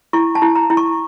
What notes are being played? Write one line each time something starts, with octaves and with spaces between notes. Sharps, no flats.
E4 C#6
A5
E4
A#5
E4
C#6